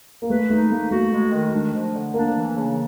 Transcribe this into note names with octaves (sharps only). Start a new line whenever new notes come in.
A#3
A3 B4
A3 D#4
A3 A#3
A3 F#4
G#3
D#3
D4
F3
D3
A#3 D4
E3
C#3